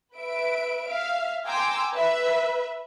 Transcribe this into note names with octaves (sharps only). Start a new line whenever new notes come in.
B4 E5 D7
E5 F5
G5 G#5 A#5 C6 D6 E6
B4 E5